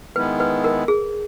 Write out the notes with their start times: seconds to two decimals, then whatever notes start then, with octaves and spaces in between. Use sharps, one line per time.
0.16 D#3 G#3 B3 E4 B4
0.40 B4
0.64 A#4
0.88 G#4